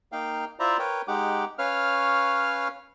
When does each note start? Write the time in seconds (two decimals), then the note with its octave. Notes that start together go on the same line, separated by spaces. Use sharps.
0.12 A#3 D#4 F5 G5
0.60 E4 F4 C5 D5 E5 A#5
0.79 A#4 B4 C#5 G5
1.08 G#3 D#4 G4 F#5 D6
1.59 C#4 B4 C#5 F5 F6